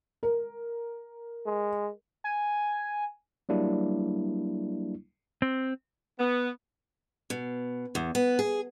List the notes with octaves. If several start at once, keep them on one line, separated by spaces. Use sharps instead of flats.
A#4
G#3
G#5
F#3 G3 A#3 D4 E4
C4
B3
B2
E2
B3
G#4